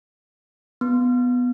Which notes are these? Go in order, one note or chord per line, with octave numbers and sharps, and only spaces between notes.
B3